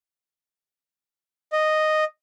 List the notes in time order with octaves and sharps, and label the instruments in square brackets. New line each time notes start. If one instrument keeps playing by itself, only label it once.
[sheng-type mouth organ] D#5